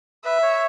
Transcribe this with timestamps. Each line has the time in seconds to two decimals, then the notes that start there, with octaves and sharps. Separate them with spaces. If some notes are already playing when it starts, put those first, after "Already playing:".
0.24 B4 E5
0.42 C#5